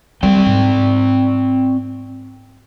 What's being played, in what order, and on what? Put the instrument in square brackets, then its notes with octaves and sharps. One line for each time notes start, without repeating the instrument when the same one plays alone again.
[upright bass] G3 [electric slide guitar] C4 D5 G5
[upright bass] G#2